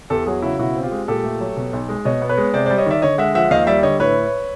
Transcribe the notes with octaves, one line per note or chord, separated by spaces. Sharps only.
E2 G4 A4
F#3 F#4 G#4
C#3 E4 F#4
B2 E4 F#4
C4
F4 G4
G#3
A#2 G4 A4
A3
F#3
B2
B1
G#3
B2 C#5 D#5
B3
B4 C#5
G#3
C3 C5 D5
C5 D5
G3
C#5 D#5
D#3 D5 E5
D3 C#5 D#5
G#3 E5 F#5
F3 E5 F#5
D#2 D#5 F5
G3 D5 E5
D3 C#5 D#5
A2 B4 C#5